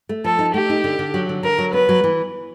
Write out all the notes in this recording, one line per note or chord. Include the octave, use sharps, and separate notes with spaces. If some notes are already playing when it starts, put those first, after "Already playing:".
A3
F3 A4
D#4
A3 G4
D#4
D3
D3
F#3
D3
D3 A#4
F#3
B3 B4
F#3
E3